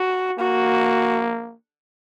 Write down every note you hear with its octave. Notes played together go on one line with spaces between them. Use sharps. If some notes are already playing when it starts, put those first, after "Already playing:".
Already playing: F#4
A#3 F#4